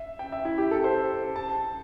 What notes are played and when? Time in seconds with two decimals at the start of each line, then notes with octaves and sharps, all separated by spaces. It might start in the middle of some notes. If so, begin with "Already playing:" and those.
Already playing: E5
0.19 G5
0.32 E5
0.45 E4
0.58 G4
0.71 A4
0.84 C5
1.36 A5